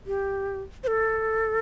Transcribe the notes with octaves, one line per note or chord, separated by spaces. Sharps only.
G4
C5
A4